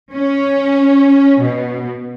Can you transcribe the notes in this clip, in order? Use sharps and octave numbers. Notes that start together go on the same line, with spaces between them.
C#4
B2